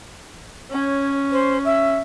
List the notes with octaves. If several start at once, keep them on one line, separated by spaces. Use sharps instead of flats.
C#4 C#5
C5
E5